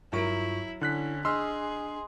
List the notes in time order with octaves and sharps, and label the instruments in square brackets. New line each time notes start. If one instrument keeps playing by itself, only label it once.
[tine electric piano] G2 F4 C#6 [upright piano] F#3 A#4 D7 [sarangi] E4
[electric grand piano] D3 F#6 B6 [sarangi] C#4 [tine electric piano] E4
[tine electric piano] D4 [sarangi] G#4 [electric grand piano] D#5 C6 [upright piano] E6 F6